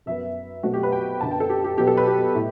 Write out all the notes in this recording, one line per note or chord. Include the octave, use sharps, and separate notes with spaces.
F#2 F#3 B3 E5
B2 F#3 A3 C4 F#4
G4
B4
G5
F#2 D3 F#3 B3 A5
G5
A4
G4
G4
B2 F#3 B3 G4
A4
B4
G4
A2